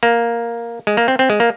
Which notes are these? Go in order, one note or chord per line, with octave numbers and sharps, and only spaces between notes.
A#3
G#3
A#3
C4
C4
G#3
A#3